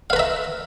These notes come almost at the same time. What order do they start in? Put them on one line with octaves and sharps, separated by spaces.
F5 B4 A#5 E5